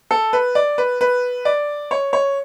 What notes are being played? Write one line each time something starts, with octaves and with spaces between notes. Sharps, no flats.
A4
B4
D5
B4
B4
D5
C#5
C#5